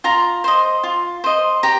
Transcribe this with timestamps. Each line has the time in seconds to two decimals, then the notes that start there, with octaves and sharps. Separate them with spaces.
0.04 F4 A#5
0.44 C5 D#5
0.84 F4
1.24 C5 D#5
1.63 G4 A#5